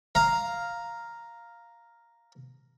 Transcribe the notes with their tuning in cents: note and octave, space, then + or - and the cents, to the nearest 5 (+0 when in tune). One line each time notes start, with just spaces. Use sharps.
F5 +0 A#5 +0